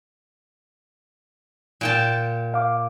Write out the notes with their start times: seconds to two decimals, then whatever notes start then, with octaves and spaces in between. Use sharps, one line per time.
1.81 A#2 G5 A5
2.54 F5 D6